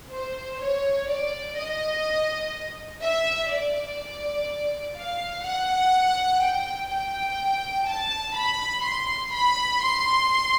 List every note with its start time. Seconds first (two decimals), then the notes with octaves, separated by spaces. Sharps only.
0.12 C5
0.60 C#5
1.08 D5
1.57 D#5
3.02 E5
3.50 D5
4.96 F5
5.45 F#5
6.42 G5
6.90 G5
7.87 A5
8.35 B5
8.84 C6
9.32 B5
9.80 C6